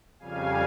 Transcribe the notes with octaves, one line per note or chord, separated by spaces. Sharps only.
F2 C#3 G3 F5 G#5